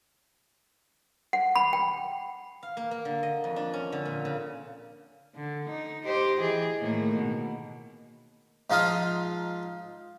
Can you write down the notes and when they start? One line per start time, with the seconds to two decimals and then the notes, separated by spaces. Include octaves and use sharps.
1.33 F#5
1.56 B5
1.73 G5
2.63 F5
2.77 A#3
2.91 A#3
3.05 D3
3.23 D#5
3.44 F2
3.56 D4
3.73 C#4
3.92 D3
4.05 A#2
4.25 C#3
5.35 D3
5.69 D#4
6.04 G4 C5 D#5
6.40 E3 G#4
6.77 A2 D#3 A#3
7.16 B2
8.70 G#2 F3 D#4 F4 F5 D#6